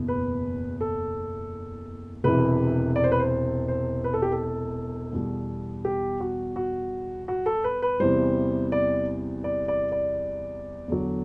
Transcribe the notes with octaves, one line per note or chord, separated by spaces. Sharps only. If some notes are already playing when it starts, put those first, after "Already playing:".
Already playing: F#1 E2 B2
B4
A4
E1 E2 C3 E3 B4
D5
C5
B4
C5
C5
B4
A4
G4
A4
E2 B2 G3
G4
F#4
F#4
F#4
A4
B4
B4
E2 C3 E3 G3 C5
D5
D5
D5
D5
E2 D3 F#3